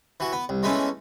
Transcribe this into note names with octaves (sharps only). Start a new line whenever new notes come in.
E3 F#4
B3
C2
E3 G#3 A3 B3 C#4